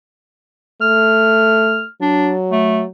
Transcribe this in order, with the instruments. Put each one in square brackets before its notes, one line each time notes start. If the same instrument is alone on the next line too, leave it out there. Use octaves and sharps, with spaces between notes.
[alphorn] A3 [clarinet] F6
[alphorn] F#3 [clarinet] D4
[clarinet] A3